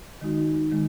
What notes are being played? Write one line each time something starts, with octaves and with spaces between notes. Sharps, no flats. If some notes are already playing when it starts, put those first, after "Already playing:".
D#3 G#3 D#4 F#4
D#3 G#3